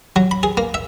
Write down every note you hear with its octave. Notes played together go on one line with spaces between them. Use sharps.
F#3
B5
G#4
A#3
E5